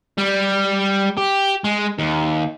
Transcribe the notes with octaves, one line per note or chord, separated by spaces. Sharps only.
G3
G4
G#3
D#2